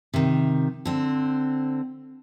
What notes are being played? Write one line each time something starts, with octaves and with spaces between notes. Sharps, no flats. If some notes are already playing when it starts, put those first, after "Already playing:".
C3 D#3
D3 C4